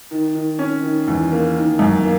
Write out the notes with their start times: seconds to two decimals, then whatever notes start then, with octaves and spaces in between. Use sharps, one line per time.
0.11 D#3
0.35 D#3
0.59 C#4
0.83 D#3
1.08 E2
1.31 A#3
1.56 D#3
1.79 F#2
2.04 A#3